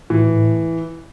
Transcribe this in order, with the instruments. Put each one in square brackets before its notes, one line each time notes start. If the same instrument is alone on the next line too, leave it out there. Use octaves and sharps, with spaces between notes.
[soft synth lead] A2 [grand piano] E3
[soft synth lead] A2